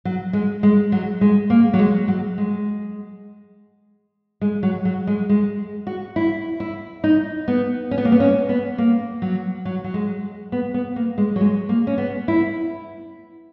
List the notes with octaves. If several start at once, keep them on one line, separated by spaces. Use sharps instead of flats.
F#3
G#3
G#3
F#3
G#3
A#3
F#3
G#3
F#3
G#3
G#3
F#3
F#3
G#3
G#3
F#4
E4
E4
D#4
B3
C#4
B3
A#3
B3
C#4
B3
A#3
F#3
F#3
F#3
G#3
B3
B3
A#3
G#3
F#3
G#3
A#3
C#4
B3
E4